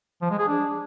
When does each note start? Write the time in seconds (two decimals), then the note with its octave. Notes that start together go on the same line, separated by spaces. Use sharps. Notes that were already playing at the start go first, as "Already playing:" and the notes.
0.22 F3
0.30 G#3
0.39 G#4
0.47 D4